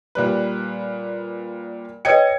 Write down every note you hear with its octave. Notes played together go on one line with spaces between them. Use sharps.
A#2 G3 B4
B4 C#5 D#5 G5 G#6 C#7